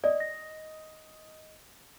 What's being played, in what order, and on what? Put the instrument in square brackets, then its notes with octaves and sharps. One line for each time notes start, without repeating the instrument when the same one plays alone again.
[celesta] D5 [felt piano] D#5
[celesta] A#6